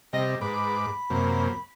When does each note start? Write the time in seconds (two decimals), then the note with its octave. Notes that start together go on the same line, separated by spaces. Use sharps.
0.13 C3 G3 D#5
0.42 G#2 B4 B5 D6
1.10 F#2 C3 A#3